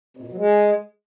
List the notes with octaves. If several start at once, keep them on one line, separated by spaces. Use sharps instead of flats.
C3
A#2
B2
F#3
G#3